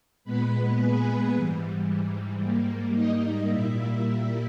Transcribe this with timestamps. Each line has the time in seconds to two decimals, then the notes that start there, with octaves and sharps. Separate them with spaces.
0.24 A#2 G#3 B3 B4 B5
0.78 G#4 G#5
1.33 G#2 E3 G3
2.41 G#2 G3 A#3
2.94 D#4 D#5
3.49 A#2 G3 A#3 E4 E5